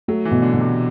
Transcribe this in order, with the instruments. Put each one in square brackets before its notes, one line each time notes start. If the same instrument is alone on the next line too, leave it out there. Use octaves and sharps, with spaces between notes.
[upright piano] F#3 [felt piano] A3
[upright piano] E3
[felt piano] B2
[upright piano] D3
[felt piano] B2
[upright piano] C3